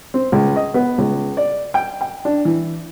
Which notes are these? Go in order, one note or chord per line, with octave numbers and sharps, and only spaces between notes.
C4
C#2
D#5
B3
C#2
D5
G5
G5
D4
E3